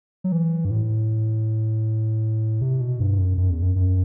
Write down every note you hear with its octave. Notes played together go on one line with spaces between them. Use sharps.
F#3
E3
G2
A2
C3
B2
G2
F#2
F#2
E2
F#2
F#2